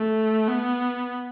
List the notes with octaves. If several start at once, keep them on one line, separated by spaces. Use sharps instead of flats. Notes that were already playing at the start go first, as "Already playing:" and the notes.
Already playing: A3
B3